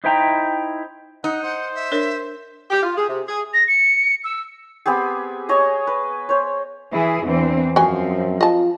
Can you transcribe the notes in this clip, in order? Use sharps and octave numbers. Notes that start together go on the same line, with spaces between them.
D#4 E4 C5 E5 G5 A#5
D#4 F#5
C5 F#5
E5
D4 A#4 C#5
G4
F4
G#4
C3
G#4
A#6
C#7
E6
B3 C4 G4 G#4
G#4 C#5 D#5 G#5
B4
C5 C#5
E3 E4 G#4
E2 E3 C4 D4
F#2 F3 C4 F#4 G#5
F4 D#5 A5